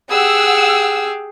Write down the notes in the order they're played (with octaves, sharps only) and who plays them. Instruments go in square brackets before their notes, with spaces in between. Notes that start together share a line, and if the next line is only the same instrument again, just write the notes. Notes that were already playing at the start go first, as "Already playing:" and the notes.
[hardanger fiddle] G4 G#4 [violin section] F#5 E6